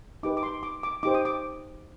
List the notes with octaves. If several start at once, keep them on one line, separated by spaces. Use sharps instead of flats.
D#4 G4 B4 D6
D6
C6
D6
D6
D#4 G4 C5 D6
D#6
D6